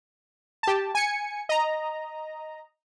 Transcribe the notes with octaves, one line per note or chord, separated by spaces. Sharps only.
G4 A5
G#5 C#7
D#5 A#5